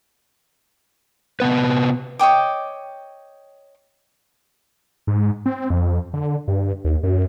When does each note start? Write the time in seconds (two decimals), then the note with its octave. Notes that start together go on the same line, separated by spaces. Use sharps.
1.40 C3 D#3 B3 B4
2.19 C#5 D#5 G5 D6
5.07 G#2
5.46 C4
5.70 F2
6.14 D3
6.48 G2
6.84 D#2
7.03 F#2